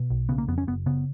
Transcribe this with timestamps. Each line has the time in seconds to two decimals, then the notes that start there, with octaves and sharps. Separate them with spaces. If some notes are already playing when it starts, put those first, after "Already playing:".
Already playing: B2
0.10 B1
0.29 C#3 B3
0.38 A#3
0.48 F2 B3
0.58 C#4
0.67 F#1 B3
0.86 C#3 B3